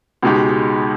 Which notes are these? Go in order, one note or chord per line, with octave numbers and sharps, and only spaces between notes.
C#2 B2 G#3 D#4 G4